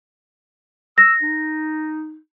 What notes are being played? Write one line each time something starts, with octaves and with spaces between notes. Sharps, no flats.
E6 A#6
D#4